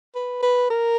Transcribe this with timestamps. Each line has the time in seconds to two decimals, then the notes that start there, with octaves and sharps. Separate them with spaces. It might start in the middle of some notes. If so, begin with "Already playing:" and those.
0.15 B4
0.43 B4
0.70 A#4